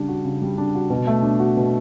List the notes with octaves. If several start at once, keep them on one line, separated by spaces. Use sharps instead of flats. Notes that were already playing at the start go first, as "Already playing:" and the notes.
Already playing: C#3 G3 D4
F#4
C#3
G3
D4
F#4
B2
A3
D4
F#4
B2